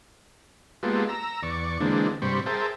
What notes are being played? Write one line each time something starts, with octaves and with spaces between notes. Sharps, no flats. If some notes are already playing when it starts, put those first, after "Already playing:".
G#3 A#3 B3 F4 G4 A4
A#5 E6
E2 D5 C#6
D3 E3 G#3 A#3 C4 D4
G2 C3 G3 C5 B5 C#6
G#4 A#4 C5 E5 G5 A5